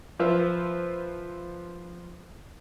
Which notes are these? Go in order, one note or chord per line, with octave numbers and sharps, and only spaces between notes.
F3 F4 B4 C5 E5